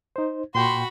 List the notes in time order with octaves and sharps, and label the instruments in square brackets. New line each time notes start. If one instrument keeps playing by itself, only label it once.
[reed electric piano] D#4 C5
[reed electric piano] A#2 G5 [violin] F#4 B5 [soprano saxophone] C6